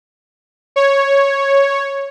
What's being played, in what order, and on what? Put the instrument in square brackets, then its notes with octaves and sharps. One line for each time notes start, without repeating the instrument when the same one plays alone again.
[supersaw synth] C#5